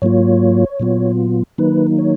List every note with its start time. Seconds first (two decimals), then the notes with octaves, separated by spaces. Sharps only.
0.02 G#2 F#3 A#3 F4 C#5
0.80 A#2 F#3 B3 F4
1.58 D#3 F#3 A#3 D#4 B4
1.99 C#5